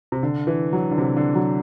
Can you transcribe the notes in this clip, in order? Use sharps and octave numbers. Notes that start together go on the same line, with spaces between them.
C3
D3
E3
F#3
D3
C3
D3
F#3